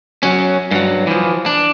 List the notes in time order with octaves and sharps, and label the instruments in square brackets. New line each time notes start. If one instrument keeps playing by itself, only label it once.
[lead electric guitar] F#3 C#4
G2 F#3
E3 F3
D4